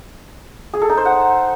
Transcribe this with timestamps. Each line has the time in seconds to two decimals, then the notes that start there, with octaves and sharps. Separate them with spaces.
0.74 G#4
0.82 A4
0.89 D#4
0.97 C5
1.05 F#5